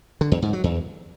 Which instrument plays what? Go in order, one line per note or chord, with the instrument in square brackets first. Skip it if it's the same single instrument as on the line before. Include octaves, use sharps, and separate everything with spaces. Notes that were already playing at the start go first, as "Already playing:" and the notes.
[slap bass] D3
E2
G#2
F#3
E2